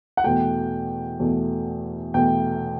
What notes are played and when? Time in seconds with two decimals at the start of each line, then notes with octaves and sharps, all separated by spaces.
0.17 F#5
0.24 E2 B2 A3 G5
1.19 E2 B2 A3
2.14 E2 B2 A3 G5